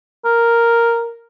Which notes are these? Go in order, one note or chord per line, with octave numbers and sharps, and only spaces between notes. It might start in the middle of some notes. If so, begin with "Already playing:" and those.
A#4